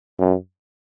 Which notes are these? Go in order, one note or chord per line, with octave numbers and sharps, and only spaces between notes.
F#2